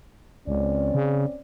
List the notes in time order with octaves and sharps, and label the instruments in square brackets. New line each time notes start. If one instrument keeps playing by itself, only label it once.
[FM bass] C#2 [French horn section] C4 C#4 D5
[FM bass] C#3